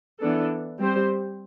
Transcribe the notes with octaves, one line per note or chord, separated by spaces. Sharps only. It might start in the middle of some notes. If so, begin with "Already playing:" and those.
E3 B3 D4 A4
G3 C4 G4 C5